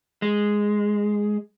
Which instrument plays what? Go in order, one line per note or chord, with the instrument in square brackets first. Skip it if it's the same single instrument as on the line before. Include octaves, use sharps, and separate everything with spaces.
[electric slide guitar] G#3